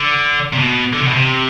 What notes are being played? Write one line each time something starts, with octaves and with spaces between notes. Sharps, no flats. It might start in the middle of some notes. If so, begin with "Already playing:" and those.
Already playing: D3
C3
B2
D3
C3
B2
C3